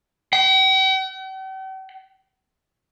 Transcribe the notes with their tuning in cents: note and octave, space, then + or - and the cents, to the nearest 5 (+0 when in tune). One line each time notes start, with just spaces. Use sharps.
G5 -45